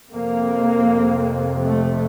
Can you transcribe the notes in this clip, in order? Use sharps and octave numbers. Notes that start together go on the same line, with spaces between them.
F2 C3 A#3
A3